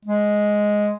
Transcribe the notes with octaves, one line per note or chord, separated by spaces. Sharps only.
G#3